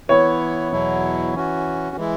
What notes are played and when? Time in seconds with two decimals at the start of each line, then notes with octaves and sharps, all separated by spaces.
0.09 E3 B3 E4 C#5
0.72 E2 B2 F#3 E4
1.34 E3 C#4 F#4
1.96 E3 G#3 E4